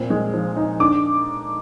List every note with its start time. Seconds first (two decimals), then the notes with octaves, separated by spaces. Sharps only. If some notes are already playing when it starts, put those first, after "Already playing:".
Already playing: A#2 C4
0.10 G#3
0.34 F3
0.56 D#4
0.80 D4 D6